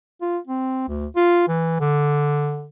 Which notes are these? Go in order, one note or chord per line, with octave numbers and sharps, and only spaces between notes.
F4
C4
D2
F4
E3
D3